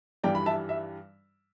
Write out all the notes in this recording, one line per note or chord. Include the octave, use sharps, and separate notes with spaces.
G2 E3 G3 D5 G5
B5
E5 A5
E5